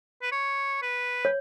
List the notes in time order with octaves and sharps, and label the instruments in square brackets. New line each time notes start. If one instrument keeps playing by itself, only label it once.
[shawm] B4
C#5
B4
[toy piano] C#5